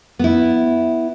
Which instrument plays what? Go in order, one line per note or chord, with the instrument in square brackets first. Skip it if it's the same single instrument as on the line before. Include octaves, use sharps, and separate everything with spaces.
[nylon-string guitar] B3 E4